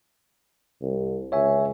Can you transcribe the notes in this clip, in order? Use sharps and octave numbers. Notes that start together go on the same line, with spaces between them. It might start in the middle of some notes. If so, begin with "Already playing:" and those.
C2
C#2 C#5 E5 G#5